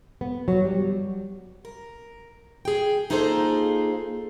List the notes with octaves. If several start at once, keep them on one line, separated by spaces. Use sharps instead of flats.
B3
F#3
G3
A#4
G#4 G5
A#3 D#4 F4 G#4 A4 C5